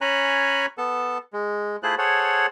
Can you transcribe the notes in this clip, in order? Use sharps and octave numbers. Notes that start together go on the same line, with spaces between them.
C#4 C#5 G#5 A#5 B5 F#6
B3 A4 A5
G#3
A3 E4 F4 G#4 C5 F#6
G#4 A4 C5 C#5 F#5